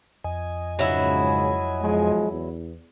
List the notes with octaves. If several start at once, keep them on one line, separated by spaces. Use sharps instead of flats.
F2 D#5 G#5
C#2 G#2 C#3 F#3 E4
B1 F3 G#3
E2